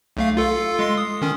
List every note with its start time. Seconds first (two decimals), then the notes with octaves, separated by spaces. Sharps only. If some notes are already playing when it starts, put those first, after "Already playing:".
0.17 B1 A3 F5
0.37 F4 A4 F5
0.79 G#3 C6 C7
0.97 D#6
1.22 D#3 C#4